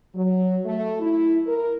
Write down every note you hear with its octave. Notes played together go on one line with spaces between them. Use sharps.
F#3
A3
E4
A#4